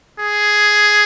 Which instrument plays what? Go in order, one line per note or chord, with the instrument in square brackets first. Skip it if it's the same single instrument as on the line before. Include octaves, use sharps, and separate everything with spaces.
[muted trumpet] G#4